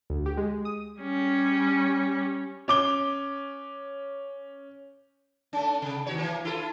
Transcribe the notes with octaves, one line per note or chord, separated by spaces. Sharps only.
D2
G4
G#3
G#3
D#6
G3 C#4
C#4 D6 G7
A3 C#4
C3
D#2 F#4 C#5
E3 A#3
E4 F4 A4